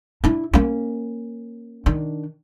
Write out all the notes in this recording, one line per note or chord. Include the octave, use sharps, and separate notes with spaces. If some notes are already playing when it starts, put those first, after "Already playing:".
D4 E4
A#3 C#4
D#3 D4